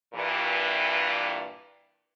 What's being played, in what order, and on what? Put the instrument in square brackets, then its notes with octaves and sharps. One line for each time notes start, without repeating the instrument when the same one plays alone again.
[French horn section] G2 A#2 E3